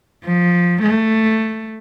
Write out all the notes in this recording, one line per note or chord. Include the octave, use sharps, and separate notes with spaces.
F3
A3